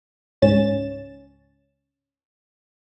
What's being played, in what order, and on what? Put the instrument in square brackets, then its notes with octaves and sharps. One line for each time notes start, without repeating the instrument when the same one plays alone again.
[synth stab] C#2 G#2 C#4 A6 E7